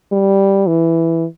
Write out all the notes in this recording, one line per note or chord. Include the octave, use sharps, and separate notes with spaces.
G3
E3